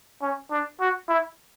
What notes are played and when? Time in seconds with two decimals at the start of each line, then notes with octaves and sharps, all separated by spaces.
0.22 C#4
0.50 D4
0.80 F#4
1.09 E4